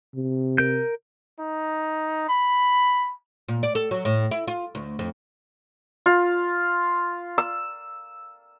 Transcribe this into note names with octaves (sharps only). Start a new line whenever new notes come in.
C3
A#4 G6
D#4
B5
A#2
D5
A4
F#3
A2
E4
F4
D2
F2
F4
E6